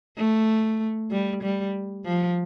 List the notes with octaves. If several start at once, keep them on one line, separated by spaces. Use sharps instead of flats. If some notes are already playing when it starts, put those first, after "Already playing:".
A3
G3
G3
F3